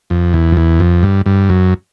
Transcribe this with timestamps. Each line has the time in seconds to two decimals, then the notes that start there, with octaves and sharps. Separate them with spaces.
0.10 F2
0.34 E2
0.52 F2
0.57 E2
0.80 F2
1.03 G2
1.26 G2
1.49 F#2